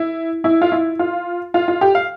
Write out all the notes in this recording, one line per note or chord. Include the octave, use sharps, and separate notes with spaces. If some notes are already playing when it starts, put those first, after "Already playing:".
Already playing: E4
E4
F4
E4
F4
F4
F4
G4
F5